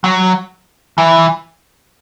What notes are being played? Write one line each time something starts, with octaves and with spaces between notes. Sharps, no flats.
F#3
E3